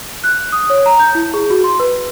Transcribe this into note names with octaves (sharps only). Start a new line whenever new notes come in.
F#6
D#6
C#5
A#5
G6
E4
G#4
F#4
C6
B4